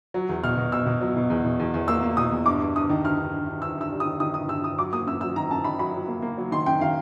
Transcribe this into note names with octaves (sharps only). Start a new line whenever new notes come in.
F#3
E2
B2 F6
B2
B2 E6
B2
F#3
B2
E2
B2
E2
E2
A#3 E6
A#3
B2 D#6
E2
G2 D6
G2
G2 D#6
D#3
G2 F6
G2
G2
G2
G2 E6
G2 E6
G3
D#6
D#3
D#3 D#6
G2 D#6
G2 E6
G2 D#6
F#3 D6
A#3 D#6
F#2 E6
F#3 E6
D#3 A#5
F#2 A5
D#3 B5
F#3 B5
F#3
A#3
A#3
F#3
D#3 C6
F#2 G5
D#3 F5